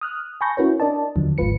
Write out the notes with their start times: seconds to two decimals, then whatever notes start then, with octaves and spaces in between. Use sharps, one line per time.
0.01 D#6 F6 F#6
0.41 G#5 A5 B5 C#6 G6 A#6
0.57 C#4 E4 F#4 A#4 B4 C#5
0.80 D4 A#4 D5 D#5 A5
1.16 D#2 D3 F3 F#3
1.38 G1 G#2 G#3 F4 B4 C#7